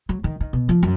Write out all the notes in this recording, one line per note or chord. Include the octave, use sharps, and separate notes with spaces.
F#3
D#3
D#3
B2
F3
F#2